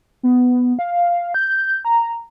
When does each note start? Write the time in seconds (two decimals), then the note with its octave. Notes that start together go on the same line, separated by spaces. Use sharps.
0.23 B3
0.79 F5
1.34 G6
1.85 A#5